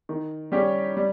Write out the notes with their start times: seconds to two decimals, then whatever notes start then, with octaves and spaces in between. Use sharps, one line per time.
0.09 D#3
0.52 G3 C#4 G4
0.97 G3